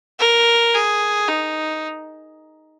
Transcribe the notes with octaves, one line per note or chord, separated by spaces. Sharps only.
A#4
G#4
D#4